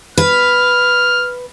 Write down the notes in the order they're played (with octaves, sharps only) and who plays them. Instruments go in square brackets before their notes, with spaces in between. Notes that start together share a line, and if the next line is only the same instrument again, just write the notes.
[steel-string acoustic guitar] B4 [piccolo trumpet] F6